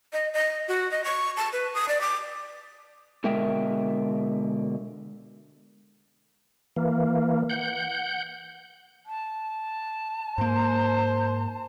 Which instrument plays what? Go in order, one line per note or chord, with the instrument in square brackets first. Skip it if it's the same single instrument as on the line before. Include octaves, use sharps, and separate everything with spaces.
[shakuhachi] D#5
D#5
F#4
D#5
C#6
A5
B4
D#6
D5
D6
[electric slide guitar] B2 D3 G#3 A#4 E5 G5
[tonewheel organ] E3 A#3
F#5 G6
[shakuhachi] A5
[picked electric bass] G#2 A#3 [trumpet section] C5